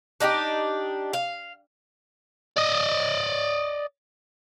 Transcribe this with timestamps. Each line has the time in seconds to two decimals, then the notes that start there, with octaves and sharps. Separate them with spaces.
0.20 D4 D#4 F#4 G4
1.13 F5
2.57 D5 D#5